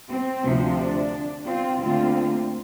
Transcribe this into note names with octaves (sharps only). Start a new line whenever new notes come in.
C4
D2 C3 F3
D4
C4 F4
D2 D3 A#3 C4 F4